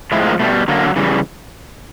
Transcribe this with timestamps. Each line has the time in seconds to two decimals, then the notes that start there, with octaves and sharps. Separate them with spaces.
0.12 A2 F3 G#3 E4
0.26 A#3
0.39 B2 G3 A3
0.68 D3 F#3 A#3
0.96 C#3 E3 G3